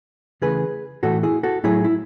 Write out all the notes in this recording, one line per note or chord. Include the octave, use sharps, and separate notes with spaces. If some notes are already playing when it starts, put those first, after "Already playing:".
C#3 E3 A3 G#4 B4
A2 E3 A3 F#4 A4
E4 G#4
F#4 A4
A2 F#3 A3 E4 G#4
E4